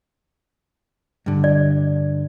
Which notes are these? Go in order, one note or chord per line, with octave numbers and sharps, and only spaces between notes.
G2 D3
D5